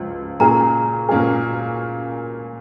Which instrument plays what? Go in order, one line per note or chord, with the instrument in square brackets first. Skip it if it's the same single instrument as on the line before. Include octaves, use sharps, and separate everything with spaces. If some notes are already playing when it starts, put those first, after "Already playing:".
Already playing: [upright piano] C#2 F3
[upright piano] A#2 A#3 C#4 G#4 [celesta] A#5
[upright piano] A#2 A#3 C#4 G#4